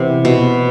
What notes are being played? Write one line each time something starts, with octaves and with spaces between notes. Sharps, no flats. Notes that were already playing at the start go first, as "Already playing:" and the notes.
Already playing: C3 E3 B3 E4
B2